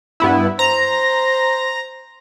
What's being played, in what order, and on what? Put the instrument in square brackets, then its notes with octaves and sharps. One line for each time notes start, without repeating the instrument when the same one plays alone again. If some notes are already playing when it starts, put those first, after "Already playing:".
[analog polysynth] G2 B3 E4
[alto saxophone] C5 [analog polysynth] A#5